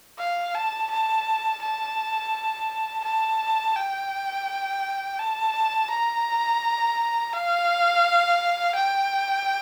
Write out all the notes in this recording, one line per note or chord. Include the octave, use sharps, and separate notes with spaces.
F5
A5
A5
A5
A5
G5
A5
A#5
F5
G5